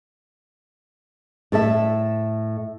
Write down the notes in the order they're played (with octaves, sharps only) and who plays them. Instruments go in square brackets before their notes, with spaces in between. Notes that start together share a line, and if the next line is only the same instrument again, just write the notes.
[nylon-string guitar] A2 A4 E5